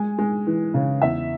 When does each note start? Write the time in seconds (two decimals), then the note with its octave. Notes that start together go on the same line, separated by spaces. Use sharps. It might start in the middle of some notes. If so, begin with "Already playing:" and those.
Already playing: G#3 G#5
0.18 G#3
0.47 E3
0.74 C#3
1.02 E2 E5